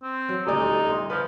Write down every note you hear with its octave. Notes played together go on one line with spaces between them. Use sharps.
C4
F#3
D#1 D2 D#4 D5
G1 C6
F3 B4 C5